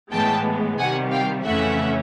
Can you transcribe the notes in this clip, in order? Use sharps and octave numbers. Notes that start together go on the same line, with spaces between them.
A2 E3 G#3 B3 G5 A5
C3 D#3 G3 F#5 G#5
F5 G5
F2 C#3 E3 A3 C#4 E5 F#5